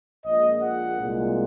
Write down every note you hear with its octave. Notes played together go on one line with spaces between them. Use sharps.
A#1 A#2 G#3 D#5
F#5
C2 A#2 G#3